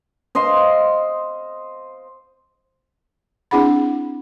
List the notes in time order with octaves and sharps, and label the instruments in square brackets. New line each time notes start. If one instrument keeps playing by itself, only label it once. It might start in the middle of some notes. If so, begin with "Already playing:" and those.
[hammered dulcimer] C5 D#5 F5 C6
[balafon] C4 D4 E4 G#4 F#5 B5